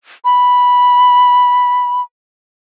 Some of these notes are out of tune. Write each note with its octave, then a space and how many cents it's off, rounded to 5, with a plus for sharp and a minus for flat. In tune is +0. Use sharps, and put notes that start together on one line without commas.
B5 -5